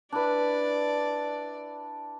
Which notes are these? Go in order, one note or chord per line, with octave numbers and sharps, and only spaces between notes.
D4 E4 B4 D5